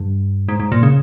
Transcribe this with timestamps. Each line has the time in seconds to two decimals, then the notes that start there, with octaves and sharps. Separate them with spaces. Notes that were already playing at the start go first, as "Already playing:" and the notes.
Already playing: G2
0.49 G#2
0.60 G#2
0.72 A#2
0.83 C#3